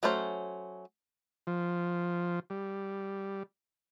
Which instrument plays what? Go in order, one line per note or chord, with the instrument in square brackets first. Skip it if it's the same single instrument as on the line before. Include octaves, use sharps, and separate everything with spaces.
[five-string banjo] F#3 A3 C#4 C5
[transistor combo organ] F3
G3